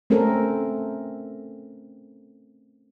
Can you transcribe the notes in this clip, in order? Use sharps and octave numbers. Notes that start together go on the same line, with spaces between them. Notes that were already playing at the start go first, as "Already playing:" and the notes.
A3 C4 C#4 A4 A#4